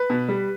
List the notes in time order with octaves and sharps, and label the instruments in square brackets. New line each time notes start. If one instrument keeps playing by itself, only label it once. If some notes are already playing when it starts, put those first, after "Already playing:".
Already playing: [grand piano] B4
B2
G3